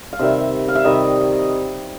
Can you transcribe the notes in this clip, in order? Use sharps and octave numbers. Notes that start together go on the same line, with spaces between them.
F5
C3 D#3 G3 E5
F5
E5
C3 D#3 G3 D#5